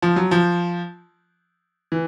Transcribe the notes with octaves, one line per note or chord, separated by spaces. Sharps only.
F3
F#3
F3
E3